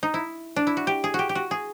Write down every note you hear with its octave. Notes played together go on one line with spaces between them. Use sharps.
D#4
E4
D4
E4
F#4
G4
G#4
F#4 G4
G4
F#4
G#4